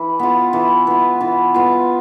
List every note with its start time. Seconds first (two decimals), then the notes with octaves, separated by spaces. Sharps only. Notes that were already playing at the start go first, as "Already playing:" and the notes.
Already playing: E3
0.19 B3 F4
0.53 E3
0.87 B3 F4
1.21 E3
1.54 B3 F4